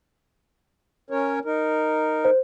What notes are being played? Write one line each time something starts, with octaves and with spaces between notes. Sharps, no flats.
C#4 A#4 C#5
D#4 A#4
C5